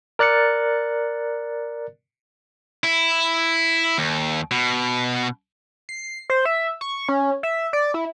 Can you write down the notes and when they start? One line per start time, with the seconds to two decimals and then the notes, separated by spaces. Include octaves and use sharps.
0.19 A#4 D5 F#6 A6 C#7
2.84 E4
3.98 D#2
4.51 B2
5.89 C7
6.30 C5
6.45 E5
6.81 C#6
7.09 C#4
7.43 E5
7.73 D5
7.94 E4